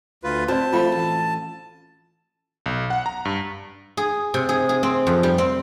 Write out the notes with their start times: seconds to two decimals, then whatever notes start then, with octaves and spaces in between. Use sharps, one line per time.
0.24 D2 F4 B4
0.48 C4 F#4 D5 A5
0.73 F3 A3 F4 G5 B5
0.92 A1
2.66 B1
2.90 F#5
3.06 A#5
3.25 G2
3.97 G#4
4.34 C3
4.49 G#4
4.69 G#4
4.83 C4
5.07 F2
5.23 G3
5.38 C4